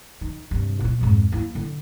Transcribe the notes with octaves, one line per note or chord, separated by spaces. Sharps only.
D#3
G2 C3
A#2 F4
F2 G#2
A#3 E4
D3